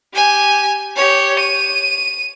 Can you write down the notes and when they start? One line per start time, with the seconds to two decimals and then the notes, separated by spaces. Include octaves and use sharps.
0.14 G4 G#5
0.96 G4 C#5
1.39 D#7